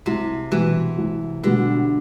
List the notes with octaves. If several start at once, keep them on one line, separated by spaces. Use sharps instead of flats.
C2 C3
B2 E3 G3
C2
B2 D3 G3